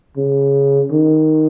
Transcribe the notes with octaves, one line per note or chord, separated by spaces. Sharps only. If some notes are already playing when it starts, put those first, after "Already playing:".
C#3
D#3